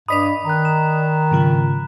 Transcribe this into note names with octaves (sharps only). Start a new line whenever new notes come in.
G2 D5 D#5 B5 D#6 B6 F7
D#3 A#5 F#6
E7
G#2 C#3 F3